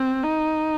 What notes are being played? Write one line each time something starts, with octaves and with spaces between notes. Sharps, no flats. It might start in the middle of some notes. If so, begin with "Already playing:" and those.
Already playing: C4
D#4